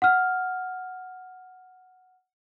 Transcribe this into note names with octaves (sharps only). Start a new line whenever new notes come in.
F#5 F6